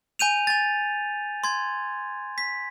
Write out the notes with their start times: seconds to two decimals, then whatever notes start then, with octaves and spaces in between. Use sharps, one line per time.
0.19 G#5 G6 D#7 F7
0.47 G#5 A6
1.44 C6 G#6
2.38 B6